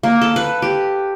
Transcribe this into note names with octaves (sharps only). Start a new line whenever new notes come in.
A#3
A4
B4
G4